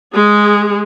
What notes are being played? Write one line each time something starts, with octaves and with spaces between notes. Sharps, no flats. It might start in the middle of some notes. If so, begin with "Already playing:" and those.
G#3 G#4